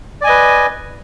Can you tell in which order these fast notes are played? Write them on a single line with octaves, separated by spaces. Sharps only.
D5 G#5 D#5 B4